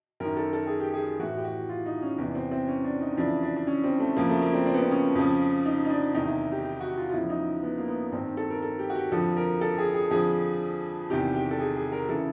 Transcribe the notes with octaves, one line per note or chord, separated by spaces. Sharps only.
F#2 D#3 A#4
A4
A4
G#4
G4
G#4
A2 E3 F#4
G4
F#4
F4
D#4
C#4
E2 C3 E3 B3
C4
C4
C#4
D4
D#4
F2 C#3 E3 D4
D4
D4
C#4
C4
A3
F2 C#3 F3 A#3
A3
A#3
C4
C4
B3
C4
C#4
F2 C#3 F3
D#4
D#4
D4
E2 C3 D#3 D#4
E4
G4
G4
F#4
F4
F4
E2 C#3 F3 E4
D#4
B3
A#3
B3
G2 D#3 C4
A4
A#4
A4
G4
F#4
G4
F2 D3 F3 A4
A#4
A4
G#4
G#4
F2 D3 F3 G#4
E2 C3 D#3 G4
G4
A4
G#4
G#4
A#4
C#3 E3 A4